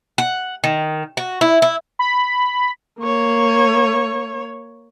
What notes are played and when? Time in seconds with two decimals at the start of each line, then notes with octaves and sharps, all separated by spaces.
0.18 F#5
0.64 D#3
1.17 F#4
1.41 E4
1.62 E4
1.99 B5
2.99 A#3 C#5